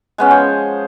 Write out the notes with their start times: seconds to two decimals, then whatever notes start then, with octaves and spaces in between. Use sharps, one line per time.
0.18 G#3 B3 C#4
0.31 F3 C5 C#5